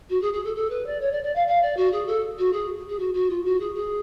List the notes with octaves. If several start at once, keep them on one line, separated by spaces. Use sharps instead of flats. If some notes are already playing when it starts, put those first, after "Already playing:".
F#4
G#4
G#4
A4
A4
B4
D5
C#5
D5
D5
F5
F5
D5
F#4
G#4
A4
F#4
G#4
G#4
F#4
F#4
F4
F#4
G#4
G#4